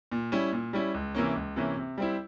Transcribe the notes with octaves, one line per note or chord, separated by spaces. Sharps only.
A#2
G3 C#4 E4
A#2
G3 C#4 E4
C#2
C3 E3 A#3 C#4
C#2
C3 E3 A#3 C#4
C3
G3 C4 E4